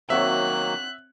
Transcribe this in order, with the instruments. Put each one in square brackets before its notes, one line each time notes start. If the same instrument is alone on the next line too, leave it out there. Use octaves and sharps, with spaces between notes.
[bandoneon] D#3 F#3 A#3 [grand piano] C4 F#4 C#5 [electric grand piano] E5 [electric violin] F#6